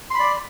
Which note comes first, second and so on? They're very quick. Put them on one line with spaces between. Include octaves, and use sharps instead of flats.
C6 B5 D5